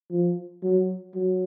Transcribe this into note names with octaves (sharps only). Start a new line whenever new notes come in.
F3
F#3
F#3